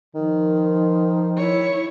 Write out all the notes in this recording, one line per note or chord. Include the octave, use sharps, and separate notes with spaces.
D#3 F3
E4 C#5